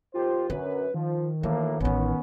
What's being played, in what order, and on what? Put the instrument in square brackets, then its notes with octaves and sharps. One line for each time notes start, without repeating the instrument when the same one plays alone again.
[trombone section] D#2 G4 C5 [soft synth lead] F4
[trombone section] F#2 [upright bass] D3 [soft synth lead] B4
[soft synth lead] D#3 [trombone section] F3
[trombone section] D2 A2 A#3 [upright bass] E3
[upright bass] A1 D#4 [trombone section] B3 C#4